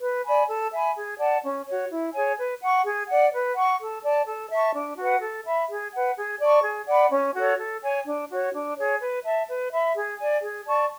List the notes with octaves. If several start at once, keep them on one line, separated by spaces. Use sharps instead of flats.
B4
D5 G#5 B5
A4
E5 G#5 B5
G#4
D5 F#5 A5
C#4
F#4 C#5
E4
G#4 C#5 G#5
B4
F#5 C#6
G#4
D5 F#5
B4
F#5 C#6
A4
D5 A5
A4
E5 A5 C#6
D4
F#4 B4 F#5
A4
E5 B5
G#4
B4 F#5
G#4
D5 A5 C#6
G#4
D5 F#5 B5
C#4
F#4 A4 C#5
A4
C#5 G#5
D4
F#4 C#5
D4
G#4 C#5
B4
E5 A5
B4
E5 B5
G#4
D5 G#5
G#4
D5 A5 C#6